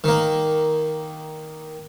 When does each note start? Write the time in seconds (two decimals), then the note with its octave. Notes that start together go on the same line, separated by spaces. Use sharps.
0.04 D#3 A#3